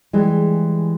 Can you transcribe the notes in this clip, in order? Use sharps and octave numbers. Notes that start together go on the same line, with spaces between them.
E3 G3 G#3